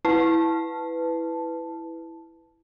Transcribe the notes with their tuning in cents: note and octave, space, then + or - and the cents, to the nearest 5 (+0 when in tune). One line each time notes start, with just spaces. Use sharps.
E4 +0 B4 +10 A5 +0